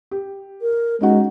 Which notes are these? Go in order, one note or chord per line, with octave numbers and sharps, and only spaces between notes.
G4
A#4
G#3 C#4 D#4 F#4